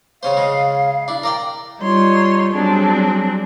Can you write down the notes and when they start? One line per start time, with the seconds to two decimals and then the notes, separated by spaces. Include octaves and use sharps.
0.23 C#3 C#4 C5 F5
0.37 C#3 G#3
1.08 D4 E4
1.23 A#4 D5 G5
1.80 G3 D#4 F4 C#5 C6
2.53 F#3 G3 C4 D4 G#4